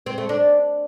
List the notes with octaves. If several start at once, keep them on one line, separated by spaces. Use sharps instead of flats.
C4
A3
D4